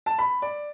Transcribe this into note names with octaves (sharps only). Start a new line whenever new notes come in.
A5
B5
D5